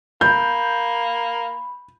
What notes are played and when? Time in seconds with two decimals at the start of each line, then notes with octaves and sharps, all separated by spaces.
0.21 A#3 B5 G6